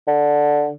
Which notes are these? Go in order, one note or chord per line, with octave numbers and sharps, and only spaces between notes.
D3